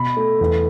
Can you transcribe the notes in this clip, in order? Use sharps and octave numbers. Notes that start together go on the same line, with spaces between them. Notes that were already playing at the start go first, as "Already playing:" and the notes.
Already playing: B2 B5
A3
E2